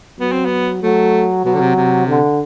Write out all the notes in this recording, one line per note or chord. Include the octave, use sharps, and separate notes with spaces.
F#3 B3
C4
B3
F#3 A3
B2 F#3
D3
C3
C3
D3